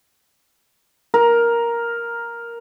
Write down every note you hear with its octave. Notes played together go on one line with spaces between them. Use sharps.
A#4